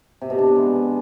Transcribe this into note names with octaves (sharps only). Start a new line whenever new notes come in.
C3
B2
D4
B3
G#3